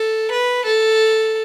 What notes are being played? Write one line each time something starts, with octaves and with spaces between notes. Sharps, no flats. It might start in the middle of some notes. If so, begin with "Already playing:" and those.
Already playing: A4
B4
A4